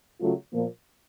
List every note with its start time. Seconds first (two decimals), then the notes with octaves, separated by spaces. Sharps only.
0.21 C#3 F#3 A3 C#4 F4
0.53 A#2 F3 A#3